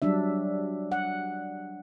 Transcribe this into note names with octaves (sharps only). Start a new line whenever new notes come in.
F#3 G3 D4 E5
F#5